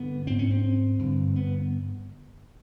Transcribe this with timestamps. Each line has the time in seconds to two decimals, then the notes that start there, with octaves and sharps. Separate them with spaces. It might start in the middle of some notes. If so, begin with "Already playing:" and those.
Already playing: G2 D3 B3
0.27 G#2 C4
0.39 C#4
0.51 C4
0.99 G2 D3
1.36 B3